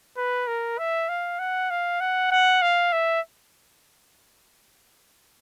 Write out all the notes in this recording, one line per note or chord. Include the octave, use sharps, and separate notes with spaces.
B4
A#4
E5
F5
F#5
F5
F#5
F#5
F5
E5